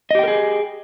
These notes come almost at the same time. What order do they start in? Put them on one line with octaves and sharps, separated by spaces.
D#5 G4 G5 A#4 G#4